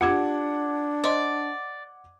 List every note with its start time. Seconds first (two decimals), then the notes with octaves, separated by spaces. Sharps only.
0.01 D4 F4 G4 F#5 D6 G#6
1.04 C5 D5 D#5 C6